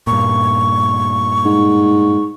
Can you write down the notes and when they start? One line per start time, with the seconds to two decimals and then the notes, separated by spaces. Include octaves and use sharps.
0.07 G2 A#2 C#6
1.45 G#2